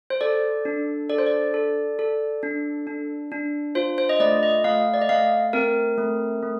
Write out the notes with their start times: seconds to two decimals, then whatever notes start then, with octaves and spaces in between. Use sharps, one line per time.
0.10 C5
0.21 A4 D5
0.65 D4
1.10 A4 D5
1.18 C5
1.27 D5
1.54 A4
1.99 A4
2.43 D4
2.87 D4
3.32 D4
3.75 F4 C5
3.98 C5
4.09 D#5
4.20 A3 D5
4.43 D#5
4.64 A3 F5
4.94 D5
5.01 D#5
5.09 A3 F5
5.53 C4 A#4
5.98 A3
6.42 A3